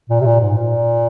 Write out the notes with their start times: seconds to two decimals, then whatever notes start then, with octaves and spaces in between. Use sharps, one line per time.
0.10 A#2
0.21 C3
0.26 A#2
0.41 G#2
0.57 A#2